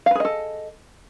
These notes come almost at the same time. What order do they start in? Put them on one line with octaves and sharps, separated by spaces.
F5 B4 G#4 D#5 A4